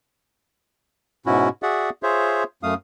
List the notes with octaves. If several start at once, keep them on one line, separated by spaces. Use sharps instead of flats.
G#2 B2 C#4 E4 F#4
F#4 G#4 D5 E5 F#5
F4 G#4 C5 C#5 E5
F#2 A3 F5 D#6